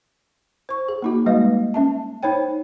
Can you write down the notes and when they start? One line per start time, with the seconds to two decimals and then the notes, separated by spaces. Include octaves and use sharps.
0.69 C5 C#6
0.88 G#4
1.02 A#3 D#4 F#4
1.26 G3 G#3 A#3 B4 D#5 F5
1.74 C#4 E5 A5
2.23 D#4 C5 C#5 G5